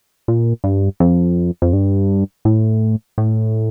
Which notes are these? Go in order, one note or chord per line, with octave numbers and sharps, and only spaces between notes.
A#2
G2
F2
F2
G2
A2
A2